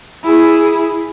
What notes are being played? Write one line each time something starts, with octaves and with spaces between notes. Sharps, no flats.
E4 G#4